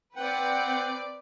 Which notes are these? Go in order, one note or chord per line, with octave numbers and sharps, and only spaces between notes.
C4 B4 D5 F#5 G5